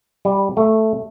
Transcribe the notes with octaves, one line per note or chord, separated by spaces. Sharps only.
G3
A3